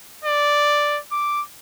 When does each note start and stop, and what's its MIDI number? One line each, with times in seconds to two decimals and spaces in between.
0.24 0.99 74
1.12 1.42 86